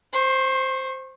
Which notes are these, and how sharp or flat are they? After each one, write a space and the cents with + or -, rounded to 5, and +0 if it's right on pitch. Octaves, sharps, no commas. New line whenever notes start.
C5 +0 C#6 -40